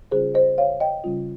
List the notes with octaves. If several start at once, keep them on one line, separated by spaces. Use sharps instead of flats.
C#3 G3 C#4 F4 G#4 C5
C5 D#5
C#5 F5
D#5 G5
C#3 G3 C#4 F4